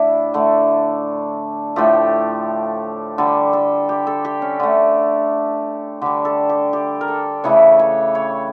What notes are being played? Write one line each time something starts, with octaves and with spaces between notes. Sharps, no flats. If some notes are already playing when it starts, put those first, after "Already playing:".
Already playing: A2 D4 E4
D3 A3
A2 F3 A3 G4
D3 G3 A4
A4
G4
A4
G4
C#4
D3 A3
D3 G3 G4
A4
G4
G4
A#4
A4
C#3 E3 A3 C#5
C#5
C#5